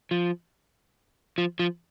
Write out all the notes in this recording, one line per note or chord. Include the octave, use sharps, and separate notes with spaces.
F3
F3
F3